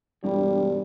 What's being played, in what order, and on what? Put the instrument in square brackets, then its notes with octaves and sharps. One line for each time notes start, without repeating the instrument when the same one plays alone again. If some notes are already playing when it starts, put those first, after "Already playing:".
[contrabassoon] E1 [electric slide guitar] G2 [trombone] G3